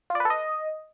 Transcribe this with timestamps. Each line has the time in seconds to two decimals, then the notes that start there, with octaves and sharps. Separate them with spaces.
0.10 F4
0.15 D5
0.20 B4
0.25 A4
0.30 D#5